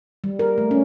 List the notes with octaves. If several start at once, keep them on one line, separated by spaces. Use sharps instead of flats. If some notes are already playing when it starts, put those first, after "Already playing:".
G3
A#4
A3
C#4